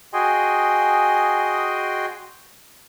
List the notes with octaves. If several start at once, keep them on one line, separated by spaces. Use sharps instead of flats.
F#4 G#4 D#5 G5 G#5 C6